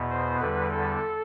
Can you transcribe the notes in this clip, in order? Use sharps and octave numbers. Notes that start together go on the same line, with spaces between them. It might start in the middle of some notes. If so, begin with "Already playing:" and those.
Already playing: E2 B2 B3
C5
E2 D3 G3 B4
A4